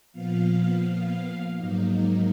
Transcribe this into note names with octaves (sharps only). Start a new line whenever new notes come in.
A#2 F3 B3 F5
G#2 F#3 A#3 D#4